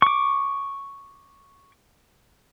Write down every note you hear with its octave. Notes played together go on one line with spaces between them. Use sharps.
C#6 D6